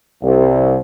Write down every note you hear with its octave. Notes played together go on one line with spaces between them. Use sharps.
C2